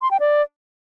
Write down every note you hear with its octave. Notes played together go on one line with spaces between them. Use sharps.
C6
G5
D5